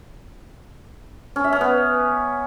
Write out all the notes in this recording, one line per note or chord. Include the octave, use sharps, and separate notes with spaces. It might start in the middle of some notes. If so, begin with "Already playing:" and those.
C#4
E5
C#4
B3